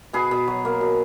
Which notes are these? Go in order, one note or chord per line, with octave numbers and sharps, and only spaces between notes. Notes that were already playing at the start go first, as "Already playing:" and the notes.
B2 G#4 B4
B2
F#3
A#3
B2